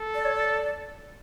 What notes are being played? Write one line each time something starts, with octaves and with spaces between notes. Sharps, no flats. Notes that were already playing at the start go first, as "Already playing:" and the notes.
Already playing: A4
D5
C#5
D5